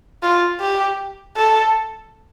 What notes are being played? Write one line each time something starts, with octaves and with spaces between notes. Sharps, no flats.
F4
G4
A4